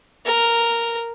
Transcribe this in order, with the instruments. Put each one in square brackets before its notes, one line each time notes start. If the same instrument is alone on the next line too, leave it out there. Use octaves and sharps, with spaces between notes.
[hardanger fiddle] A#4